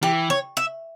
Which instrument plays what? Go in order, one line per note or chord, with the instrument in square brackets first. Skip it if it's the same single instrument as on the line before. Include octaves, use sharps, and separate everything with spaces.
[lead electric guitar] E3 [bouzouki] G4
[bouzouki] C#5
E5